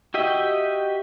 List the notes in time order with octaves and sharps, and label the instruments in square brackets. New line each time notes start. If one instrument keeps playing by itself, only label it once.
[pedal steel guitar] F#4 G4 D#5 E5 G5